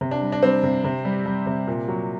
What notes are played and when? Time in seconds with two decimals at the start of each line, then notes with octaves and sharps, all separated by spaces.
0.01 C3
0.11 D4
0.22 G3
0.32 D4
0.43 G3 C4
0.63 C3
0.84 C3
1.05 G3
1.26 G3
1.46 C3
1.67 A#2
1.88 F#3